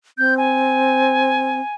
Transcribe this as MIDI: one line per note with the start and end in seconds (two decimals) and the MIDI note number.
0.18 1.60 60
0.18 0.37 91
0.38 1.75 80